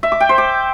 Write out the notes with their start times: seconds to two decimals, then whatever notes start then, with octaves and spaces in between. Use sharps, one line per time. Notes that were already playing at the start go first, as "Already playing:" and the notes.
0.03 E5
0.12 D6
0.20 G5
0.29 C5
0.38 D6